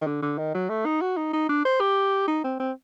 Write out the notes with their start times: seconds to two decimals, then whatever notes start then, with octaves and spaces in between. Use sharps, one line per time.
0.01 D#3
0.07 D3
0.22 D3
0.38 D#3
0.54 F#3
0.69 A3
0.86 D#4
1.01 F#4
1.17 D#4
1.33 D#4
1.49 D4
1.65 C5
1.80 G4
2.28 D#4
2.44 C4
2.60 C4